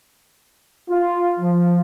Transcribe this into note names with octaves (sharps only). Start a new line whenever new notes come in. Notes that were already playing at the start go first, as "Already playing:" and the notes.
F4
F3